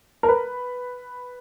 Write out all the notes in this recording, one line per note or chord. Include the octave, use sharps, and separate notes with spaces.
A#4
B4